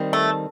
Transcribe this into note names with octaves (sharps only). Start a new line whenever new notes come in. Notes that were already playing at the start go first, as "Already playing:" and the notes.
Already playing: D#3 G3 C4
A3